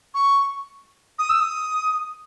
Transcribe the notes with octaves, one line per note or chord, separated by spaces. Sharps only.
C#6
D#6
E6
D#6